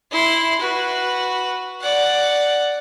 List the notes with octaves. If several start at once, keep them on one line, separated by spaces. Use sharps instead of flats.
E4 C6
F#4 B4
D5 F#5